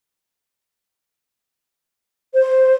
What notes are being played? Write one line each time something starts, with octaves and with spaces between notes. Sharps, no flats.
C5